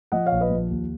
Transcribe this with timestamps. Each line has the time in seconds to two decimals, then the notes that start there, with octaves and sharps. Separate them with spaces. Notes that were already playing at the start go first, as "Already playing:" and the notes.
0.12 F3 D#5 F#5
0.26 C#5 F5
0.32 A#1
0.41 B4 D#5
0.50 F3
0.70 D#2